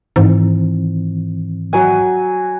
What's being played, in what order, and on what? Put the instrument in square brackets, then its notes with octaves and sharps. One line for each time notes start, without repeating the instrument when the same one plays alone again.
[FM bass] G#2 [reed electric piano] D#3 E3 C4
[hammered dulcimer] F#3 G#5